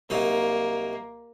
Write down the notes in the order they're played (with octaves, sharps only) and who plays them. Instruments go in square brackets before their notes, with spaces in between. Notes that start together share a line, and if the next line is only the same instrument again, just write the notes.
[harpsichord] C2 F#3 D#4 [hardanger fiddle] A#3